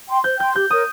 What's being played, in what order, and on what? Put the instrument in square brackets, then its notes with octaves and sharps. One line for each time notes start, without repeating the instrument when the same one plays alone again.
[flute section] G5 C6
[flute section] C5 [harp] G6
[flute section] G5 C6 [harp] G6
[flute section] G4 [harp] G6
[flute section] A#4 C#5 [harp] D#6